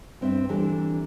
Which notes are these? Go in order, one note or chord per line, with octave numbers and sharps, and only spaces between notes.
G2 C4 D4 E5
D3 E3 G3 D4 A4 A#4